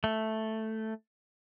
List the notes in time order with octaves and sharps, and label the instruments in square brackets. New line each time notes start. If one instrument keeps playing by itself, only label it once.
[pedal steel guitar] A3